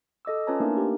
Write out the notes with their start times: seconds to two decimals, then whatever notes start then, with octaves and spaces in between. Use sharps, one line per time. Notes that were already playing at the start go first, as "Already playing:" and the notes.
0.25 A4 D#5 D6 E6
0.47 C#4 F4 B4 C#5 A5 A#5
0.60 A3 A#3 D4 D#4 A#4
0.77 G4